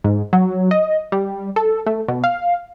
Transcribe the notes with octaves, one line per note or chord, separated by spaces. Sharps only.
G#2
F#3
D#5
G3
A4
A3
B2
F5